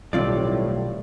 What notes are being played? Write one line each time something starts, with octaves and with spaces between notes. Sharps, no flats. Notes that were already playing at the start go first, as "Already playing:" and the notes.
B1 A2 D#3 G3 C4 F4 D5